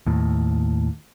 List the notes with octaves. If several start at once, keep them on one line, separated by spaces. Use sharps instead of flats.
D#2 A2